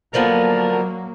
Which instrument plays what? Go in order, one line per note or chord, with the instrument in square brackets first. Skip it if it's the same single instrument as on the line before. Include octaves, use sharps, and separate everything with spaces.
[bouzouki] D3 F3 B3 [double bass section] F#3 A#3 [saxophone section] A#4